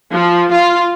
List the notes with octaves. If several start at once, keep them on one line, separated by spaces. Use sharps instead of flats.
F3
F4